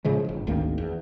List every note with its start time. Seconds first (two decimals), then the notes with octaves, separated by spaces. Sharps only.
0.05 A2 C#3 F3 G#3
0.29 G1
0.47 G#1 D2 D#3 A#3
0.78 E2